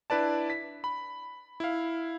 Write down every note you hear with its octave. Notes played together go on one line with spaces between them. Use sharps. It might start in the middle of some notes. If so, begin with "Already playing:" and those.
D4 E4 B4 D5 A5
B6
B5
E4 F5